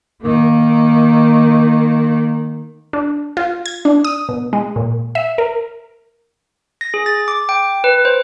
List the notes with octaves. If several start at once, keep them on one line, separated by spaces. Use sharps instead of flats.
D#3 A#3
D4
F4
G#6
D4
D#6
B2
G#3
A#2
E5
A#4
A#6
G#4
A6
D6
G5
B4
C5